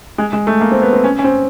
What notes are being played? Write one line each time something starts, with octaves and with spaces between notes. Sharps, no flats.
G#3
G#3
A3
A#3
C4
B3
C4
C#4
C#4
C4